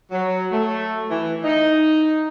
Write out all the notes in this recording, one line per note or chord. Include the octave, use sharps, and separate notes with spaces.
F#3
A3
E3
D#4